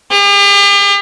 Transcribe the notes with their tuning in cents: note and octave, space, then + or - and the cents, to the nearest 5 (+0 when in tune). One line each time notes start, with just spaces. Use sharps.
G4 +45